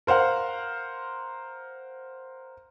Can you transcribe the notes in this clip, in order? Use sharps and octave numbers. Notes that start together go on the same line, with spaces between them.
A#4 C5 F5 F#5